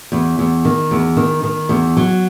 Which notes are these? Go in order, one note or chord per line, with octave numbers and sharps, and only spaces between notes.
E2
E2
D#3
E2
D#3
D#3
E2
F#3